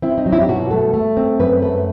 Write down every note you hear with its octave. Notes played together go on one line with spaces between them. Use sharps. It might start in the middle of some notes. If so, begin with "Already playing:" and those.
C4 E4
D#4
F#3
E4
G4
B2 F#4
A3 A4
A3
C4
F#2 B4
A3 B4